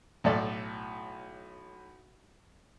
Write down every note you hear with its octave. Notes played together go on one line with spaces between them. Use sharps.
B1 A2 A4 D5